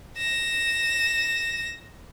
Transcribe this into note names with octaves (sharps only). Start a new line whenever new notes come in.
A#6 E7